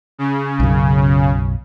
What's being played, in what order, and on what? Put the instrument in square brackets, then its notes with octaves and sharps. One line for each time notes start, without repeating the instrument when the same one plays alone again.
[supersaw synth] C#3
[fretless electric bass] B1 F#2